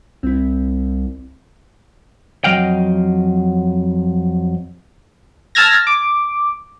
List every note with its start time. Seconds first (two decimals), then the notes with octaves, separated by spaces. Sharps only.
0.23 C2 C4 E4
2.44 F2 F3 F#3 D#5 F5 G5
5.55 A5 E6 F6 G#6 A#6
5.87 D6